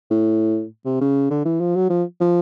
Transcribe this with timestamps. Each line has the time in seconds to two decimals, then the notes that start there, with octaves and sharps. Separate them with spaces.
0.11 A2
0.85 C3
1.01 C#3
1.30 D3
1.45 E3
1.60 F3
1.76 F#3
1.90 F3
2.20 F3